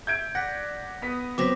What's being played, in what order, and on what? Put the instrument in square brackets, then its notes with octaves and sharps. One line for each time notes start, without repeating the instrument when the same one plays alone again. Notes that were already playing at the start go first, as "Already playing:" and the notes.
[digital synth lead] E5 [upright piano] G6 G#6 D7
[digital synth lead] D5 [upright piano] F#5 [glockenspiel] A#6 B6
[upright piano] B3 B6 [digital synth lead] D#6
[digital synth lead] F#3 [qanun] B3 C4 [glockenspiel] D6 A#6 B6